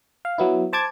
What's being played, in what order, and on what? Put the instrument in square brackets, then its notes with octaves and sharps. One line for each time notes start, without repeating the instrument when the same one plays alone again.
[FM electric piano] F5
F#3 B3 E4
C5 A5 D6 G#6